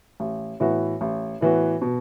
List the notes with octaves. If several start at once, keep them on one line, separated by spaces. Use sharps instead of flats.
A1
A2 E3 B3 F#4
A1
A2 E3 B3 F#4
B2